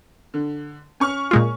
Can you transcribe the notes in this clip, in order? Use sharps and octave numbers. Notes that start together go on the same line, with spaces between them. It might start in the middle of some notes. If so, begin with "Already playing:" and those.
D3
C#4 C#6 F6
A#2 G#3 F4